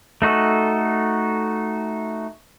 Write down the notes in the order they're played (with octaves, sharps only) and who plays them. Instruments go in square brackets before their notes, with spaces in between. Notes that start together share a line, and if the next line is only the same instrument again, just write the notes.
[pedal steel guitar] A3 D#4 F#4 A4